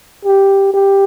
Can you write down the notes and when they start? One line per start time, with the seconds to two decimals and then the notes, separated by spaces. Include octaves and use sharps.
0.25 G4
0.74 G4